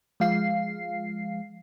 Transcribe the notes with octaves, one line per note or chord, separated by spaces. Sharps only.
F3 G#3 F5 C7